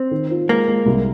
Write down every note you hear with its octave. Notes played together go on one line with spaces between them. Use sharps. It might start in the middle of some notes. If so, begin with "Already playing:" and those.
Already playing: C4
D#3
F4
G#3 A#3
G#3
C2